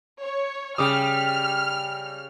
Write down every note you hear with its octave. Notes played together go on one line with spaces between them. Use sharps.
C#5
C#3 G3 D6 D#6 F6